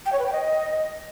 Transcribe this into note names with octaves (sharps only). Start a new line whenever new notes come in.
G5
C#5
B4
G5
D#5